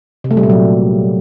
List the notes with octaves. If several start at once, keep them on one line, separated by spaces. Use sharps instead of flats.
C3
A3
G3
A#2
F#3